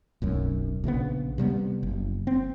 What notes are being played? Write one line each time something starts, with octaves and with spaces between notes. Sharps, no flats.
D1 B1 F#2
A#1 C#3 E3 B3
C3 G3 A#3 B3
F#1
C4